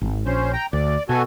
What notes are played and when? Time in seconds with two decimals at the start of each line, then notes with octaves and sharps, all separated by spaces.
0.01 G#1
0.26 A#1 C#4 C5
0.53 G5 A#5
0.73 D2 D5
1.09 B2 F#4 A4 G#5